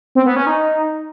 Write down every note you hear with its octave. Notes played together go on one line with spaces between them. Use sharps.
C4
B3
C#4
D#4